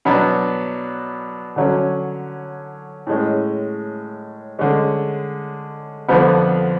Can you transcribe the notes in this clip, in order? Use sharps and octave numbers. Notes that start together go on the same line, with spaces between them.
B2 F#3 B3 D4
D3 F#3 C#4
A2 G#3 C#4
D3 G#3 C#4
F2 D3 F3 B3